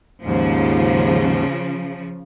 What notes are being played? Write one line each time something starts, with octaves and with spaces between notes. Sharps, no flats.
D#2 G#2 C#3 F3